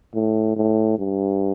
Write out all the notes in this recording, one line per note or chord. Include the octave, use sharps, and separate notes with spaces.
A2
A2
G2